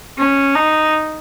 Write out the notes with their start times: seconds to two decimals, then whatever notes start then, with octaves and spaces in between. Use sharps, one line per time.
0.18 C#4
0.55 D#4